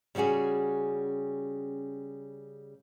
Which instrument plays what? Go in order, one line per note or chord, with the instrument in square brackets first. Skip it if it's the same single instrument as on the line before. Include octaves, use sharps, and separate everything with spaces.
[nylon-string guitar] C#3 G3 C#4 F#4 G#4